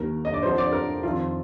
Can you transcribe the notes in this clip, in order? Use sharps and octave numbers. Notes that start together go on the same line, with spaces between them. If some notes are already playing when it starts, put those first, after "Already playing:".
Already playing: D#2 D#3 A#4
D#5
D5
F2 D3 F3 C5
D5
A#4
F2 D#3 F4